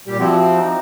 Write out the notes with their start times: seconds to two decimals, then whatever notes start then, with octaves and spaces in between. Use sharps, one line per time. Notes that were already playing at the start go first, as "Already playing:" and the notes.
0.07 A#2 G3 G4
0.19 F3 C4 E4 F#4 G4
0.57 D#4